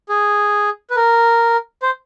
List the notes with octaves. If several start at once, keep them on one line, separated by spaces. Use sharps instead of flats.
G#4
B4
A#4
C5